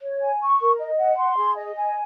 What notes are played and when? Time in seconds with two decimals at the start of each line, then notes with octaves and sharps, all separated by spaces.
0.02 C#5
0.20 G#5
0.41 C#6
0.60 A#4
0.79 D#5
0.97 F#5
1.17 C6
1.36 G#4
1.56 D#5
1.75 G#5